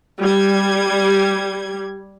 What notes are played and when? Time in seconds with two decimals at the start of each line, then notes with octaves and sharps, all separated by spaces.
0.21 G3 G#6